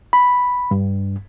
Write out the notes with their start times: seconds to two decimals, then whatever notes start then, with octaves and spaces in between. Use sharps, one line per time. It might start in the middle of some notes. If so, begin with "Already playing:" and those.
0.13 B5
0.71 G2